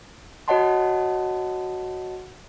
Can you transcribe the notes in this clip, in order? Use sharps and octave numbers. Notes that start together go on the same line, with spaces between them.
F#4 C#5 D#5 F#5 A5 C6